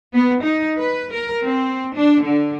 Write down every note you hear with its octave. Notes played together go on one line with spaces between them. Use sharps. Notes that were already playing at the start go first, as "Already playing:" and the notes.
B3
D#4
B4
A#4
C4
D4
D3